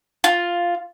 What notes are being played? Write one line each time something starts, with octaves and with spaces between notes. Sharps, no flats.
F4